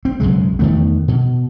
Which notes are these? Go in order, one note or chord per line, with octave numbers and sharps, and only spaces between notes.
C4
B1 F#2 C#3 G#3
E2 D#3 A3 B3
B2